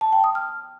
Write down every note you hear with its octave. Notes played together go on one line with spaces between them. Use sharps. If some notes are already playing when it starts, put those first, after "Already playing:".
A5
G5
D#6
F6